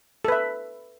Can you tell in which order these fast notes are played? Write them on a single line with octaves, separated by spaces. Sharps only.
A4 B4 E5